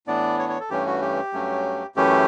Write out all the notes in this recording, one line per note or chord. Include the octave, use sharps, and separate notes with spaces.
A2 E3 B3 D4 D5
C#5
C#5
A4
G2 E3 A3 C#4 G4
F#4
G4
G2 F#3 A3 C#4
F#2 E3 A3 C#4 G4